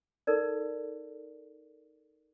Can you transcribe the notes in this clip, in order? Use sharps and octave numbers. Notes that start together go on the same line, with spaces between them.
D#4 A4 A#4 D5